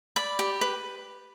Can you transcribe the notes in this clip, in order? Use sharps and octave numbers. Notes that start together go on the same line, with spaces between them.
D5 B5
G4
B4